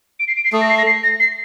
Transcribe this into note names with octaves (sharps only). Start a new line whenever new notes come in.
D7
C7
D7
C7
A3 D#6
A#6
C7
A#6
C7
A#6
C7